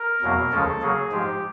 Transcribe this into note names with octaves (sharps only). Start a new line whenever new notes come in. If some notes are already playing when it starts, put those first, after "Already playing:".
Already playing: A#4
E2 B2 F#3 A#3
D#2 C#3 F3 G#3 C#4 A4
C#3 F#3 A#3 G#4
G#2 F3 G#3 G4